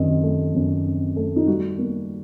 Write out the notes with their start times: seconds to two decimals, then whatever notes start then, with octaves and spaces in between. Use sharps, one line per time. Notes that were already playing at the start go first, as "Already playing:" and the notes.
Already playing: F#2 D#3 C4 D#5
0.23 A3
0.55 F#2
0.86 C4
1.16 A3
1.36 D#4
1.47 G3 F#4
1.78 A#3